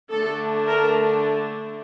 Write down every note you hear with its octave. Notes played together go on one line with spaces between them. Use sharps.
D3 A3 D4 A4
A#4